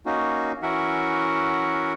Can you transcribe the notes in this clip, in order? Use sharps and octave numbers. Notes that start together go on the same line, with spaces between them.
A#3 C#4 D#4 F#4
E3 C#4 F#4 A#4 E5 F#5